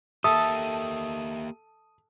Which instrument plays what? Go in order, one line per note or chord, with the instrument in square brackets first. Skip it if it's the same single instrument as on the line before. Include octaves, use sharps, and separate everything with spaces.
[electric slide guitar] A#3 G4 [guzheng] A4 A5 [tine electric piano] E5 [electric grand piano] D#6